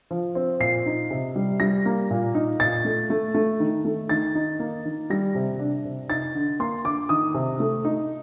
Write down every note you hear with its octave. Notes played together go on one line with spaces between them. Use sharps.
F3
C4
A#2 C7
D#4
C3
G3
G3 A#6
A#3
A#2
D#4
A#2 A6
A3
A3
A3
D#3
A3
D#3 A6
D#4
A#3
D#3
G3 A#6
C3
D4
C3
D#4 A6
D3
A#3 C6
D3 D6
D#3 D#6
C3
A3
D#4